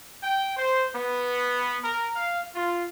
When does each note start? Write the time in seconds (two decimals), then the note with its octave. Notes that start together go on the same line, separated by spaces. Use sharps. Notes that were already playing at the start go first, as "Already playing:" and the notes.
0.22 G5
0.56 C5
0.95 B3
1.83 A#4
2.15 F5
2.55 F4